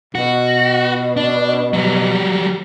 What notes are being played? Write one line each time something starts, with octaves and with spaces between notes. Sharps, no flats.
B2 F#4
D4
F#3 G3